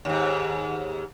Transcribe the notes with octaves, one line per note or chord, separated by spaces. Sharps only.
D#2 G#2